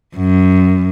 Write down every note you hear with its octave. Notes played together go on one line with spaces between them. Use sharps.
F#2